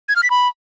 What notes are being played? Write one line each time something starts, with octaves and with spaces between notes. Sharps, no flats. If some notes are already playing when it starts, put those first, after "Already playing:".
G#6
F6
B6
B5